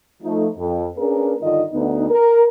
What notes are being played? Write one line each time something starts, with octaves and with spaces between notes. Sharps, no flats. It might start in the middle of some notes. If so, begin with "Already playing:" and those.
F3 A3 D#4
F2
A#3 C#4 D4 G#4 A#4 B4
G2 D3 D#3 D#4 F4 D#5
D2 B3 D#4
A#4